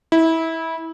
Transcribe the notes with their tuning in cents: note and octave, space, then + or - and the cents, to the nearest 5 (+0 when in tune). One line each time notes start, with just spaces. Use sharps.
E4 -20